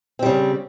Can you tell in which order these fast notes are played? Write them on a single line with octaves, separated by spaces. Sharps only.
C4 G3 C#3